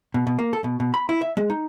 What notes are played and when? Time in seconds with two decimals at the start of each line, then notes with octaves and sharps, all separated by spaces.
0.14 B2
0.27 B2
0.39 A#3
0.53 A4
0.64 B2
0.80 B2
0.94 B5
1.09 E4
1.22 E5
1.37 G#3
1.50 D#4